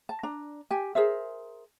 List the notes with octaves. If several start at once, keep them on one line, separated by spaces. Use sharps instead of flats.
A5
D4 A#5
G4 G#5
G#4 A#4 C5 E5